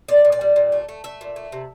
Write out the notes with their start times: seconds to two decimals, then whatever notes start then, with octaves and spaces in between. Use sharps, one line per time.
0.08 A#2 D5
0.25 A#2
0.32 D5
0.41 G3
0.56 A#2
0.72 A3
0.89 A3
1.04 A3 E5
1.21 A#2
1.36 A3
1.52 C3